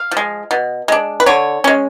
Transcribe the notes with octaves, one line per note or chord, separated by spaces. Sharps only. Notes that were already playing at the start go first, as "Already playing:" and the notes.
Already playing: F5
F3
G#3
B2
G#3 D4
B4
D3 C#5
G#3 C#4